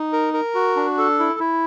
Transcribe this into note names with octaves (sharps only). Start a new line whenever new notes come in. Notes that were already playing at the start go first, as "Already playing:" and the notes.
Already playing: D#4
A#4
A#4
F#4
D4
A4
E4
E4